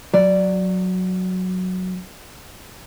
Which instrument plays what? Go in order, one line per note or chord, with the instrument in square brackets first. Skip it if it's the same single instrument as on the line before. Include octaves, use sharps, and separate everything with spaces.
[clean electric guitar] F#3 [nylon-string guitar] D5